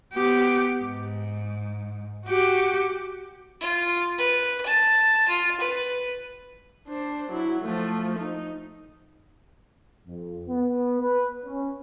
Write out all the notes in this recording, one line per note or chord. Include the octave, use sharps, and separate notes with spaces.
B3 G4
G#2
F#4 G4
F4
B4
A5
F4
B4
D4 C5
F#3 E4
F3 A3
D#4
F2
B3
B4
C#4